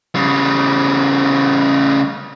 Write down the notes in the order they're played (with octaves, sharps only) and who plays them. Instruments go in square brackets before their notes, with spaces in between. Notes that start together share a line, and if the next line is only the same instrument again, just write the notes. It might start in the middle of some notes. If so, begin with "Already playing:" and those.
[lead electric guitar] C#3 G3